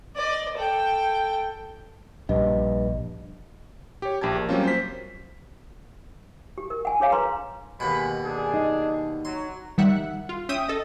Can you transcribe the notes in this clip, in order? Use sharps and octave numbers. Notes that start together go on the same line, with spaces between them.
D5 D#5
A4 G5
A#1 G2 D#5
G4 C#5
A#1 G4 A5 G#6
A#4
F#3 G3 A#3 C4 C#4 F4
C5 B6
G4
A#4
F#5 G#5
D4 G#4 C#5 F5
G#4 B4 A#5 C6
D#2 B2 G#3 G#5 B5
D4 G#4
D#4
F#3 C6
D#3 G3 E5 F#5
F4
C#4 E5 G5 D#6
A4 D#5